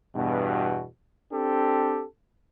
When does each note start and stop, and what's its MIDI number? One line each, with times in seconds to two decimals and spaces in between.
0.15 0.86 40
0.15 0.86 43
0.15 0.86 47
1.32 2.04 60
1.32 2.04 62
1.32 2.04 67
1.32 2.04 69